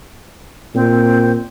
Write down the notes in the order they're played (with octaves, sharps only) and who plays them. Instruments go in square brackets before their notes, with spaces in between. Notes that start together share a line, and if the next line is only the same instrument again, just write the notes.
[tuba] A#2 [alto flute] C4